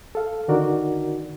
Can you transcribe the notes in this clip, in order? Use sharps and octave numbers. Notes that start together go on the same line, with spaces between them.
A4 F5
D3 D#3 D#4 F#4 A#4 D5